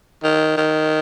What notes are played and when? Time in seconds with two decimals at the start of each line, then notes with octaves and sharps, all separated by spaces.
0.23 D#3
0.57 D#3